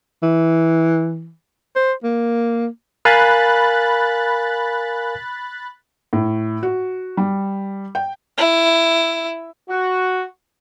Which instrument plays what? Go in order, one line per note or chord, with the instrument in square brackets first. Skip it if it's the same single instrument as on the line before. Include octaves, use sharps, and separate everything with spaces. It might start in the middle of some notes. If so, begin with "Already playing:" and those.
[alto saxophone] E3
C5
A#3
[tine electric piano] A#4 F5 G#5 [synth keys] B5 F#6 A6
[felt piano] A2
F#4
G3
G5
[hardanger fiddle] E4
[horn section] F#4